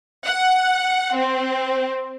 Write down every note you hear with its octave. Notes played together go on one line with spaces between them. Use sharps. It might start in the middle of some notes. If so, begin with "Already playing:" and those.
F#5
C4